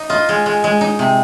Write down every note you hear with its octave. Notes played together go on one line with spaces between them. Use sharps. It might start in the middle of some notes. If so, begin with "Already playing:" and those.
Already playing: D#4
F4 D#5
G#3
G#3
G#3
D#4
C3